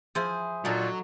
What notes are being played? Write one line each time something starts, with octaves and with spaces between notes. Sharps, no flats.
F3 E4 G#4 C5 E5
A#2 F#3 D4 D#4 A4